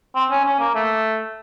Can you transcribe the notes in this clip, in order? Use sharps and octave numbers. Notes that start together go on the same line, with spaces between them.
C4
C#4
C#4
A#3
A3